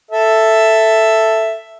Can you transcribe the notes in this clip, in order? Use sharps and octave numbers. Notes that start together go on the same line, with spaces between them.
A4 E5